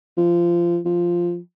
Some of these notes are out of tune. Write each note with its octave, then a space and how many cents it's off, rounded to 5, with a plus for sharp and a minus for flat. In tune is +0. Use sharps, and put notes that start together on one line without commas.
F3 -20
F3 -5